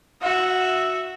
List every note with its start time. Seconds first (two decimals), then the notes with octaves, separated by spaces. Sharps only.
0.22 F#4 E5